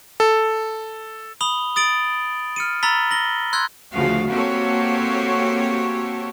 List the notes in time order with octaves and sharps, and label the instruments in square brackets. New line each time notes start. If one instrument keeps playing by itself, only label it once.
[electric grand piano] A4
[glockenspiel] B5 D#6 F7 G7
D#6 A6 D7 F#7
F6 C#7 D#7
A#5 B5 E6 A6 B6 G7
A#6 F#7 G7
C6 E6 F#6 G#6
[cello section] D2 C#3 F3 F#4 F5
A#3 C4 F#4 G4 A4 C#5